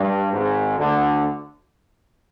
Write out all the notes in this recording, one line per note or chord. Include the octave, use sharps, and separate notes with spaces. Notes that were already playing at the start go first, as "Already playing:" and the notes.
Already playing: G2
G#1 G#2
D2 D3